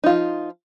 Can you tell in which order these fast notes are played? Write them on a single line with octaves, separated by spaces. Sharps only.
D#4 F4 F3